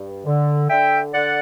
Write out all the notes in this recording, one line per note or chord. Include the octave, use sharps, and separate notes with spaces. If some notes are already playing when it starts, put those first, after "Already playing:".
Already playing: G2
D3
D3 E5 G5
D3 D5 F#5